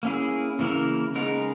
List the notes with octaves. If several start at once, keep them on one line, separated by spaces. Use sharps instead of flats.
A#3 C#4 E4 G#4
C#3 E3 A#3 E4 A#4
C#3 G#3 B3 D#4 A#4